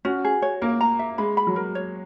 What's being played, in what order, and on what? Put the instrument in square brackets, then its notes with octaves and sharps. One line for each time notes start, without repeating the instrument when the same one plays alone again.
[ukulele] C#4 [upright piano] F#4
[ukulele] G#4
C#5
[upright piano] A#3 [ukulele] A#4
[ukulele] A#5
E5
[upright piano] G#3 [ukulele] B5
[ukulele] B5
[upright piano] F#3
[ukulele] A#4
C#5